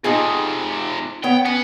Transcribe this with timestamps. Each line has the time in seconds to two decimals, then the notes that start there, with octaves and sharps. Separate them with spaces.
0.04 F2 C3 D#4 F4 G#4
1.24 B3 C#5 G5
1.46 B3 C#4